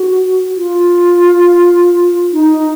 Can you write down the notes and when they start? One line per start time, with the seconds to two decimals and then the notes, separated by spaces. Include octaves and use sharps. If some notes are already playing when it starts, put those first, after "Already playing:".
Already playing: F#4
0.57 F4
2.33 D#4